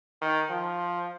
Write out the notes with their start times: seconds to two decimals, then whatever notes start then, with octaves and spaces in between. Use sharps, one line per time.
0.21 D#3
0.50 F3